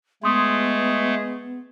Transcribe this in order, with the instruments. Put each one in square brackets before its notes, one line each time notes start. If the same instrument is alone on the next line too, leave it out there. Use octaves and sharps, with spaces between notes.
[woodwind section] G#3 G#4 [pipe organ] A3 [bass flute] B3 [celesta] C6 D#6